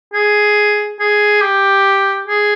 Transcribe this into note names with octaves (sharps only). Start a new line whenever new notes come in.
G#4
G#4
G4
G#4